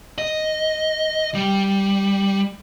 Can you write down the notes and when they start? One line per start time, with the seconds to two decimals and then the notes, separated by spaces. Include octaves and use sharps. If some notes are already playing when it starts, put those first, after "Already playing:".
0.18 D#5
1.34 G3